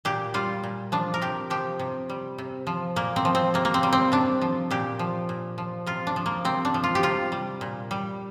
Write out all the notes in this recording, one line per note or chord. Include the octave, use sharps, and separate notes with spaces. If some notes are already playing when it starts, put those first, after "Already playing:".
A#2 G4
G3 F4
A#2
F3 D4
A#4
C3 G4
F3 G4
C3
G3
C3
F3
A#2 A#3
C4
F3
C4
C3 A#3
A#3
C4
G3
C4
C3 D4
F3
A#2 G4
F3
A#2
F3
C3 F4
D4
F3
A#3
C3 C4
D4
F3
F4
G4
C3 F4
G3
A#2
G3